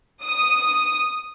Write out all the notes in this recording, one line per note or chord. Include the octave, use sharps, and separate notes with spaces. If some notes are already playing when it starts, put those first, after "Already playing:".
D#6